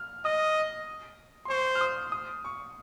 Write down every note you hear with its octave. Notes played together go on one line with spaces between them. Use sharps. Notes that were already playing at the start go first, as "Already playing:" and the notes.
Already playing: F6
D#5 D#6
C6
C5 C#6
F6
D#6
D#6
C#6